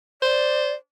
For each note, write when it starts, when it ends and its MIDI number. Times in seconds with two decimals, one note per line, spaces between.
0.22 0.75 72
0.22 0.73 74